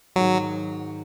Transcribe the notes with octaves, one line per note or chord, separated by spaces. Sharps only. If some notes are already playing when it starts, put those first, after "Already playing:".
G#2 D#3 F#3 G#3